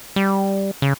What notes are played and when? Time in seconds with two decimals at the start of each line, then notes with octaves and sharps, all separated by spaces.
0.16 G3
0.82 C#3